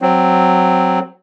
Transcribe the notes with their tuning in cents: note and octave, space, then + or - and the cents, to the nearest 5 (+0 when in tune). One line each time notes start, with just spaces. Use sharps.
F#3 +0 C4 +0